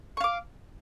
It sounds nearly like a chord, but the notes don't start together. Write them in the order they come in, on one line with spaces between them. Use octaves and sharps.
C#6 F5 D6